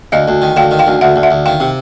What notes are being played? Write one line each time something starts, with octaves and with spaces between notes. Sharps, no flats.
D2 D#5 F5
D2
D#3
D2 F5 G5
D#3
F5 G5
D2
D2 E5 F#5
D2
E5 F#5
D2
D#3 F5 G5
C3